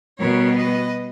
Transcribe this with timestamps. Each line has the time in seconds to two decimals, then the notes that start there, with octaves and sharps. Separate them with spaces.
0.18 B2 G3 B3 A#4 C#5
0.55 B4 D#5